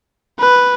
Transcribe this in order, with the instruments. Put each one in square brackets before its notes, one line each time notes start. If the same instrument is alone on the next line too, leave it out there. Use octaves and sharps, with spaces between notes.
[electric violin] B4